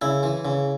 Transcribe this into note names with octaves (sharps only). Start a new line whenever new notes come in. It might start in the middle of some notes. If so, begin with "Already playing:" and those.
C#3 E4
E3
C#3